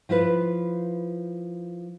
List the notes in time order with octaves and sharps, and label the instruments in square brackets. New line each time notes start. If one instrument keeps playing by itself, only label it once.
[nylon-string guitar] F3 E4 F4 B4